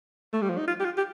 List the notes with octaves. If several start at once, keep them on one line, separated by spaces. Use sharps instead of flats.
A3
G3
F3
D#4
F4
G4
F4
G4